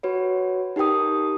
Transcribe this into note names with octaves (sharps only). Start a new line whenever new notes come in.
F#4 B4 C#5
D#4 G4 A#4 G5 D#6